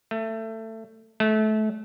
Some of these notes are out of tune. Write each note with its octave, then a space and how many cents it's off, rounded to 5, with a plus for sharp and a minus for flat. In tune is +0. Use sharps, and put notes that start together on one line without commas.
A3 +20
A3 -25